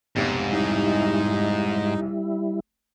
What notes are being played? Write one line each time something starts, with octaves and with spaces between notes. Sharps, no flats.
F1 B1 G#2
G3 D#4 E4